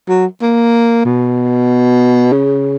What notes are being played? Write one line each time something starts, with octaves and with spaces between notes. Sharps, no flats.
F#3
A#3
B2
C#3